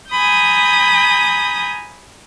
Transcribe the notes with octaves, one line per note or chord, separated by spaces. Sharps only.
G#5 A#5 B5 D#6 G6